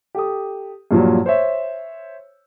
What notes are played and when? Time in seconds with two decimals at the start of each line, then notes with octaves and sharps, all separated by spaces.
0.15 G4 A4 D#6
0.91 G2 A#2 F3 F#3
1.26 C5 C#5 E5